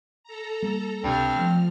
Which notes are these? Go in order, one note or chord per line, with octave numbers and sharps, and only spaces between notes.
A4 A#5
G3 A#3
C#2 G2 C3 C4 F6
F3 A3